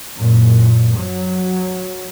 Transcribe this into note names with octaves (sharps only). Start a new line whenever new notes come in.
F#2 A#2
F#3